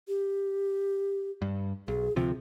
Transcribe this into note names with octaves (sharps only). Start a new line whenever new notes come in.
G4
G2
B1 G#4
D2 C3 F3 F4